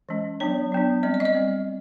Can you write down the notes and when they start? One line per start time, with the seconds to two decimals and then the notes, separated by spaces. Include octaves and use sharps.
0.09 E3 G#3 C#4
0.40 F#3 B3 D4 C#5
0.72 F#3 B3 D4
1.03 G3 C4 D5
1.14 D5
1.20 D#5
1.25 D5
1.35 G3 C4